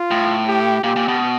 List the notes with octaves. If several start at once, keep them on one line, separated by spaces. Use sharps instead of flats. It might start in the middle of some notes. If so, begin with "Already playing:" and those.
Already playing: F4
A2
G4
A#2 G4
A#2
B2